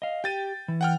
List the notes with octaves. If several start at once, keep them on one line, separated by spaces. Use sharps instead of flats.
D#5 F5
G4 G5 A6 D#7
E3
F#5 G5 F6